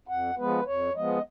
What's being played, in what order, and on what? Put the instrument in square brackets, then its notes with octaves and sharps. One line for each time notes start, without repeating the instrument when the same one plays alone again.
[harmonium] F2 F#5
F3 G#3 B3 B4
F2 C#5
F3 G#3 B3 D#5